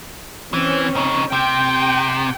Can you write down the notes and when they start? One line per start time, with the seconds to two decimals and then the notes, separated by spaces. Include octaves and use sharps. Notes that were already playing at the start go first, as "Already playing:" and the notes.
0.53 E3 C4 C#4
0.96 C#3 D#4
1.33 C3 G5